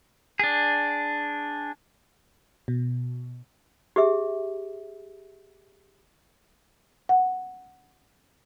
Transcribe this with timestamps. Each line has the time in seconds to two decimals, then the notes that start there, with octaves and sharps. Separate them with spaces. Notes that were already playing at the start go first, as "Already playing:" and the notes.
0.39 D4 G#4
2.68 B2
3.96 G4 G#4 E5
7.09 F#5